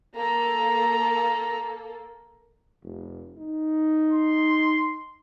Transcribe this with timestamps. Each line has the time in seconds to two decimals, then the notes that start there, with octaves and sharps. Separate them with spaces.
0.16 A#3 A4 A#5
2.83 F1
3.38 D#4
4.12 C6